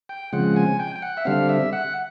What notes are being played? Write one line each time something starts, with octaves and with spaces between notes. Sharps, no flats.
G5
C#3 F3 G#3 C4 F#5
G#5
G5
G5
F#5
E5
D3 G3 C4 F5
E5
F#5